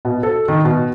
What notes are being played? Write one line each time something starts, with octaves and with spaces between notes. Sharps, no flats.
B2
A4
D#3
B2